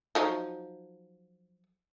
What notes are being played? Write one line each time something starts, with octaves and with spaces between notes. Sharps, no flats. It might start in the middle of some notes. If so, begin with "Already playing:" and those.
F3 F#3 D#4